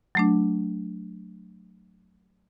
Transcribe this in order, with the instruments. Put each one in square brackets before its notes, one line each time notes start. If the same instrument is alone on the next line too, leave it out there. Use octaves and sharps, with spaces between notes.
[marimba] F#3 A3 D4